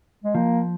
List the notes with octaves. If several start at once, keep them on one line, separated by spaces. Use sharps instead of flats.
G#3
F3 A#3